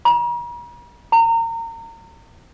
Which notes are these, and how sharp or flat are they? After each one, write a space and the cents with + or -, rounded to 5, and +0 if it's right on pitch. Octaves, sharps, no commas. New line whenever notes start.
A#5 +45
A#5 -30